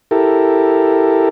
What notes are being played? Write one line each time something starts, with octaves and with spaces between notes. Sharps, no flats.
E4 G4 A4 A#4